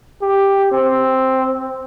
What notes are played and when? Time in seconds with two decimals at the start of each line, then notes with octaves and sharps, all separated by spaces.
0.22 G4
0.72 C4